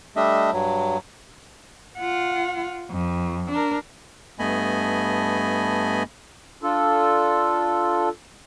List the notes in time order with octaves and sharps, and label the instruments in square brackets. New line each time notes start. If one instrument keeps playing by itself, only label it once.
[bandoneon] G3 A3 D4 D#5 E5
G2 F#3
[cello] F4 F#5
F2
D4 A#4
[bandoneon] G2 A3 B3 D#5 G#5 B5
[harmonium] D4 F4 A4